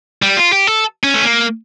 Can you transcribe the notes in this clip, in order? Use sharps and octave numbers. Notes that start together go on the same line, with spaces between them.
G3
F4
G4
A4
C#4
A3
A#3